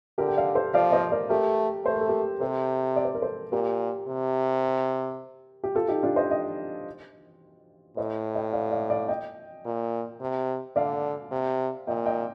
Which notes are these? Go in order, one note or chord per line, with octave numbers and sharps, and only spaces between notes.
D3 G4 A#4
G5
D5 F5
A4 C5
F3 D5 F5
C5 D#5
A#4 D5
A3 G4 A#4
A3 C5
A#4
A4
G4 A#4
C3 A4 C5
D5
C5
A#4
A4 C5
A#2 G4 A#4
C3
G4
F4 A4
D#4 G4
D4 F4
C5 D#5
D#5 G5
A2 C5 D#5
D#5 G5
D5 F5
D5 F5
D5 F5
D#5 G5
A#2
C3
D3 D5 F5
C3
A#2 D#5 G5
D#5 G5